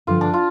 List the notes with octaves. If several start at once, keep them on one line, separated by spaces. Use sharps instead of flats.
G2 D3 F3 F4
D4
F4